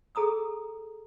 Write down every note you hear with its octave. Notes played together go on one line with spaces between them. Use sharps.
G#4 A4 A#5 D#6 E6